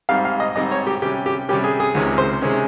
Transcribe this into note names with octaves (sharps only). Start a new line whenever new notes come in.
G#2 G3 C4 D#4 F5
F5
D#5
G#2 G3 C4 D#4 D#5
C#5
G4
C3 G3 C#4 G4
G4
C3 G3 C#4 G4
G#4
G#4
C#2 C3 D#3 G#3 C#4
C5
C3 D#3 G#3 C#4